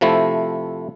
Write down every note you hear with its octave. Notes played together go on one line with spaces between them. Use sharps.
C3 F3 A3 E4